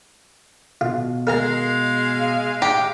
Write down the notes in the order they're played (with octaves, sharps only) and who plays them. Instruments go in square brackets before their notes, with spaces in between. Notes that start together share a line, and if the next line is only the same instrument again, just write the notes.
[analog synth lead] B2 [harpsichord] F4
[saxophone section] G#3 F5 [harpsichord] A#4 G#5 A#5
[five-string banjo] G4 [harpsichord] A#5